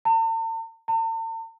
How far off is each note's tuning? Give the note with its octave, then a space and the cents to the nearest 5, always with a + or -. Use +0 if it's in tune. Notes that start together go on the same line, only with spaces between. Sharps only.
A5 +45
A5 +45